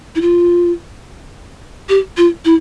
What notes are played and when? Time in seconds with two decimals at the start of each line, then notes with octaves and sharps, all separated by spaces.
0.15 E4
0.21 F4
1.89 G4
2.17 F4
2.45 E4